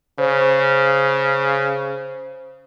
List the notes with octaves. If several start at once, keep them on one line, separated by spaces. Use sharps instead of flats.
C#3 C5 C#5